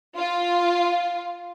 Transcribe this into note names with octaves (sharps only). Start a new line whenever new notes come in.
F4